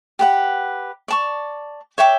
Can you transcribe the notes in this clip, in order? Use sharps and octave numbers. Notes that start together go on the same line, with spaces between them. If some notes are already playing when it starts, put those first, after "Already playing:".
G4 B4 F#5
D5 A5 C#6
C#5 E5 G5 D6